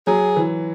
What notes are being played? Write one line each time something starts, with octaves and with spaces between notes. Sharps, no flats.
F#3 G#4
E3